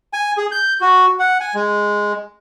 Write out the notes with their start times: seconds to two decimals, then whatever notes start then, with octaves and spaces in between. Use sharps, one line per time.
0.13 G#5
0.37 G#4
0.52 G6
0.81 F#4
1.19 F#5
1.40 G#5
1.54 G#3